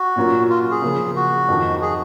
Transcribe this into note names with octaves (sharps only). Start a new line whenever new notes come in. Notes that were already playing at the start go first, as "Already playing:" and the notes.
Already playing: F#4
A#2 F#3 C#4 F4 A#4
F4
G#4
C#3 F3 A#3
F#4
F2 D#3 F#3
G#4